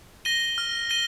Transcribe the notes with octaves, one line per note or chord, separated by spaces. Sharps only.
A#6 D#7 G7
F6
A#6 D#7 G7